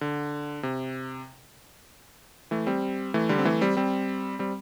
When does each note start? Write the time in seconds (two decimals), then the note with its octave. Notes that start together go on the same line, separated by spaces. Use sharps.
0.01 D3
0.63 C3
2.51 E3 A3
2.67 G3 C4
3.14 E3 A3
3.29 D3 G3
3.38 C4
3.45 E3 A3
3.61 G3 C4
3.77 G3 C4
4.39 G3 C4